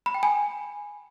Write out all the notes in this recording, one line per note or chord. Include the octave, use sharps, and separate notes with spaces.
B5
G5
G#5